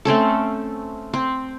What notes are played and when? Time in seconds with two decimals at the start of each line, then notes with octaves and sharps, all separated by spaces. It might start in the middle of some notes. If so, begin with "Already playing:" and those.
0.05 A3 C4 C#4 A4
1.13 C4